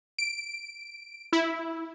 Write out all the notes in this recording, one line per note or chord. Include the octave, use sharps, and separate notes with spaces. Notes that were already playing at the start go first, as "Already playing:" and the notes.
D7
E4